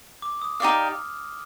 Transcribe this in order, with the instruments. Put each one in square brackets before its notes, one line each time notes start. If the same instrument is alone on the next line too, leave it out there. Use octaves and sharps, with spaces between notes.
[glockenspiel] D6
D#6
[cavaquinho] D#4 G4 D5 F5 [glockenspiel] F6